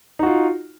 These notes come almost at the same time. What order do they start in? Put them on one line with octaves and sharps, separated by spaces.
D#4 F#4 F4